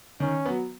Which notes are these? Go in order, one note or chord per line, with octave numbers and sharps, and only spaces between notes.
D#3 C#4
F#3 B3